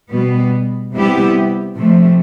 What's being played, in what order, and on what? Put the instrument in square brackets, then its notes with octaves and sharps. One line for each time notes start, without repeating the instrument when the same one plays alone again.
[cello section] B2 G3 B3
C3 G3 B3 E4 G4
C3 F3 A3